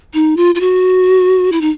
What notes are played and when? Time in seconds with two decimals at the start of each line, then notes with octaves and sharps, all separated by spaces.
0.14 D#4
0.37 F4
0.55 F4
0.61 F#4
1.52 E4
1.61 D#4